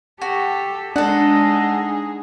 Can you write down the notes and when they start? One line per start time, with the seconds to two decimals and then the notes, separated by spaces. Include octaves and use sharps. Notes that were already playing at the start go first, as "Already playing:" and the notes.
0.22 F#4 G4 A4
0.96 G#3 D4 D#4 G#4 A4 F#5